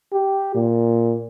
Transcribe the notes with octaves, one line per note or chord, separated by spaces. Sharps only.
G4
A#2